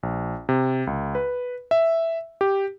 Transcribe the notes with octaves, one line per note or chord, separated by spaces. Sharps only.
A#1
C3
C#2
B4
E5
G4